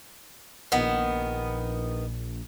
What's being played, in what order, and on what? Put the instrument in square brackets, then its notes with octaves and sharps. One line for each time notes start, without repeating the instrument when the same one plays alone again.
[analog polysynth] A#1 [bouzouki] D#3 B3